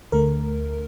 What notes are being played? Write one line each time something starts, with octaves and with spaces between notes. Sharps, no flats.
D2 D3 A3 A#4